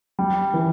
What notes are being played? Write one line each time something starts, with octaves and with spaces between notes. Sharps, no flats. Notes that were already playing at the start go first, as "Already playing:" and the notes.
G3
E3